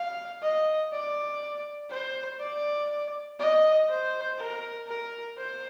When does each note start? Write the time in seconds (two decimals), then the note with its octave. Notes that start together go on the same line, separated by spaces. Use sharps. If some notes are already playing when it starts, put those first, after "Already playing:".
Already playing: F5
0.42 D#5
0.92 D5
1.90 C5
2.40 D5
3.39 D#5
3.89 C5
4.38 A#4
4.87 A#4
5.38 C5